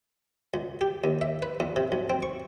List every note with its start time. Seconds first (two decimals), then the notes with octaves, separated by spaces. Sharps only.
0.54 C#2
0.81 G4
1.04 D#2
1.21 E5
1.42 B4
1.60 E2
1.76 C3
1.92 B1
2.10 C4
2.23 C#6